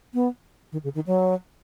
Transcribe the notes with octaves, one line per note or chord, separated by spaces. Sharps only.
B3
D#3
C#3
D#3
F#3